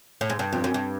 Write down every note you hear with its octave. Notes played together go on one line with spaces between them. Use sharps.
A2
G#2
G2
F2
F#2
G2